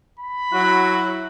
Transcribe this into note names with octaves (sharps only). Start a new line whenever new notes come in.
B5
F#3 E4 F#4